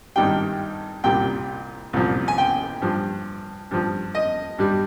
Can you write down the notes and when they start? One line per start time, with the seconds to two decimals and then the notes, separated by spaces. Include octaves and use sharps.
0.16 G#1 G2 D#3 G3 G5
1.04 C2 A#2 G3 G5
1.93 C2 A#2 F3
2.28 G#5
2.38 G5
2.82 G2 F3
3.71 G2 F3
4.15 D#5
4.59 G2 G3